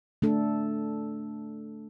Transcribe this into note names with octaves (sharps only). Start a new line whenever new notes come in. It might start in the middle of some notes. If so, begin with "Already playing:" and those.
A3 D4 A4